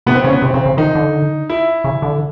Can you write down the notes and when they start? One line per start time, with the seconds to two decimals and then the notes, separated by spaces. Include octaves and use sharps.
0.06 C3 B3
0.15 C4
0.24 C#3 C#4
0.33 B3
0.42 C3 C4
0.54 C#3 C4
0.66 C#3
0.77 D#3 D#4
0.95 D3
1.49 E4
1.84 C#3
2.02 D3